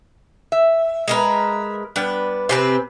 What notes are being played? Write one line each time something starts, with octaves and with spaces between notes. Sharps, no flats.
E5
G#3 A#4 B4
G3 B3 D4 B4
C3 C4 B4 C5 G#5